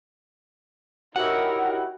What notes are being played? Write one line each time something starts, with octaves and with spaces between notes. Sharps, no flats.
F#3 D#4 E4 F#4 G4 A#4 F#5